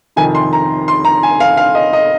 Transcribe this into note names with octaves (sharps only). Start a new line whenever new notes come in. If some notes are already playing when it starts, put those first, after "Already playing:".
F2 C3 D#3 G#5
C6
A#5
C6
A#5
G#5
F5
F5
D#5
D#5